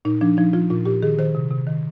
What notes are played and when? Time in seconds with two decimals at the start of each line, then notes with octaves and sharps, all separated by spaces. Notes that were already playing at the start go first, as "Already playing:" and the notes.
0.05 A#2 D#4
0.21 F3 D4
0.37 F3 D#4
0.53 F3 F4
0.70 A#2 F4
0.86 A#2 G4
1.03 D#3 G#4
1.18 D#3 C5
1.35 C3
1.51 C3
1.67 D#3